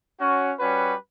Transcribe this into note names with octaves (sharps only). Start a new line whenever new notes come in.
C#4 F#4
G3 C#4 F#4 B4